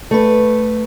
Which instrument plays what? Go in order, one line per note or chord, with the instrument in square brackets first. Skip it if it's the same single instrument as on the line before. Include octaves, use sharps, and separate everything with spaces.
[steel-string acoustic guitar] A3 B4